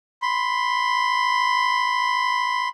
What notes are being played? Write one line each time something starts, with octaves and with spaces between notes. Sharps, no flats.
B5 C6